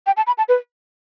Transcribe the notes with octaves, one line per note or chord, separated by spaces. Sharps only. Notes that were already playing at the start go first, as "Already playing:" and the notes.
G5
A5
B5
A5
B4